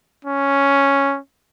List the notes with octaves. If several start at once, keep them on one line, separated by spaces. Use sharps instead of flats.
C#4